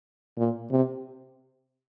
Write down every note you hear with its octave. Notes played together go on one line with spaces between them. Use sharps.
A#2
C3